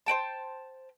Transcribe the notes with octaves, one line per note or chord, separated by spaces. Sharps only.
C5 D5 G5 A5